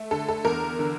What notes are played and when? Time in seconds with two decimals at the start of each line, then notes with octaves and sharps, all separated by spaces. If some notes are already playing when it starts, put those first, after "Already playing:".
Already playing: A3
0.11 D3 A4
0.28 A4
0.45 E2 A#4
0.79 D3